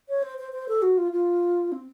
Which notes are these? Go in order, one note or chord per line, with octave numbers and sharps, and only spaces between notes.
C#5
C5
C5
C5
A4
F#4
F4
F4
C4